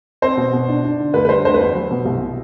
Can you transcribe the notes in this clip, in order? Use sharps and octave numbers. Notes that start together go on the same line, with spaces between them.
C4 C5
B2
B2
D4
D4
D3
D2 B4
B4
G3 C5
D2 C5
B4
E2 C5
F#3
B2
C2
B2